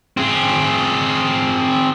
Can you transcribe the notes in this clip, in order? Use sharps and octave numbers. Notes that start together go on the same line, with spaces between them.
C4 G#4